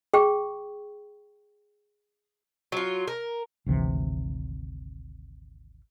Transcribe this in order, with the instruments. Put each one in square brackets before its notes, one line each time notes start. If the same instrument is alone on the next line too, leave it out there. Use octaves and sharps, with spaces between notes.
[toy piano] G#4 G5 C#6
[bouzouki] F#3 F4
A#4
[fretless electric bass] G#1 D2 C3 E3